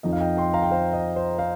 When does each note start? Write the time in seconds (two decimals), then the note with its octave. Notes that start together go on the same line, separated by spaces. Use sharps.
0.03 F2 F3 D#4 D#5
0.13 F5
0.20 D#5 G5
0.37 G5 C6
0.54 F5 A#5
0.63 G5
0.71 C5 F5
0.93 D#5
1.16 C5
1.39 C5 F5